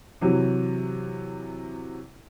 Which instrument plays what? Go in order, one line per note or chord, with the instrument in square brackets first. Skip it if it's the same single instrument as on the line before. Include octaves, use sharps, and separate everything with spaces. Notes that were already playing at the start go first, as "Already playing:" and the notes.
[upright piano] C3 E3 F#3